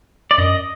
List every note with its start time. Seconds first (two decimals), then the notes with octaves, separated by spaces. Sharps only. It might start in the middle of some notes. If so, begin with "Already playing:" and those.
0.31 D5
0.38 F#2 D#5